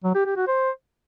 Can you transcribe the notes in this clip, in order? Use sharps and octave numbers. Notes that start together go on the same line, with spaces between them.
F#3
G4
G4
F#4
C5